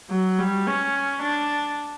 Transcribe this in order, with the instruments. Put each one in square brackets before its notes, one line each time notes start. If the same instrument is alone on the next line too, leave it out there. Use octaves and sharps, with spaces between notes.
[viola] F#3
G3
C#4
D4